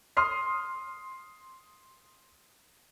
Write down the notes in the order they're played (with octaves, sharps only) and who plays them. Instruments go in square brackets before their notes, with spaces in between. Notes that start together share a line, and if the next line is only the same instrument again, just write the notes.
[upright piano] C6 D#6 F6 C7